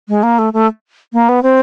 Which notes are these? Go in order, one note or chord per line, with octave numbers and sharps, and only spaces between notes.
G#3
A#3
A3
A3
A#3
B3
C4